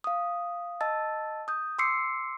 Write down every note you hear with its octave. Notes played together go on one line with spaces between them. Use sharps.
F5 D#6
D#5 A5 E6 A6
D#6 G6
C6 D6 E6 C7 C#7